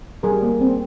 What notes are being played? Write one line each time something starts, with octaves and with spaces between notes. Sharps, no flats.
G3 G#4 A#4
A#3
C4